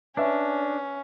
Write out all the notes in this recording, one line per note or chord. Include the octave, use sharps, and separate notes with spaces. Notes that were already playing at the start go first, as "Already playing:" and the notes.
C#4 D4 B4 E5